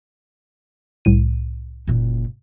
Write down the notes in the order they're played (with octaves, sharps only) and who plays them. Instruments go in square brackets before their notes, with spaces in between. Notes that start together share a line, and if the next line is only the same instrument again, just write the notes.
[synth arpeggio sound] C2 A2 D#7
[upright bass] F#1 A#2